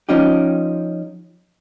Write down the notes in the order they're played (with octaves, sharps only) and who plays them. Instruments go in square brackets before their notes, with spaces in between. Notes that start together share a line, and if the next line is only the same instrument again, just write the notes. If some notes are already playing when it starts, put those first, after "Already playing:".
[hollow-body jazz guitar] F3 C#4 D#4 G4